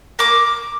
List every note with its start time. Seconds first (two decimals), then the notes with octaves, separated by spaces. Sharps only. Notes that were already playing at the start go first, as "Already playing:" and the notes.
0.19 A#3 D6